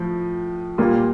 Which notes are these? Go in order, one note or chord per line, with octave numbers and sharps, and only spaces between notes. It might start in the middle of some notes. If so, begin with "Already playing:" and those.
Already playing: A2 F3
A#2 G3 A#3 F4